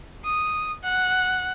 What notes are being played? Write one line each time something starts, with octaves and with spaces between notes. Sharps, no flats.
D#6
F#5